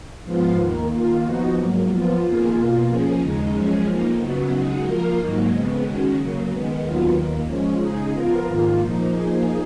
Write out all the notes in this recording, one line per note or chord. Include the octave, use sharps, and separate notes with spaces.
G#2 F3 B3 F4
D#2 D#3 A#3
D#3 A#3 F4
F3 B3 D#4 F#4
G#2 F#3 A#3
F3 B3 F4
F2 D#3 A#3 F4 G#4
B2 A#3 F4
F3 A#3 C#4 G#4
D#2 C#3 G#3 D#4
F#2 F3 G#3 C#4 G#4
F2 F3 A#3 D#4
F#2 C#3 F#3 B3 F#4
F#2 C#3 G#3 D#4 F#4
F3 A#3 F4 A#4
G#2 D#3 F#3 A#3 D#4
F2 C#3 G#3 B3
D#3 G#3 C#4 F#4
C#3 F#3 A#3
D#3 G#3 B3
D#2 D#3 F#3 B3 F4
D#2 D#3 A#3
F3 G#3 C#4
C#3 G#3 D#4 G#4
F3 B3 F4 A#4
G#2 D#3 A#3 F4
A#2 F3 A#3 D#4
F3 A#3 D#4 G#4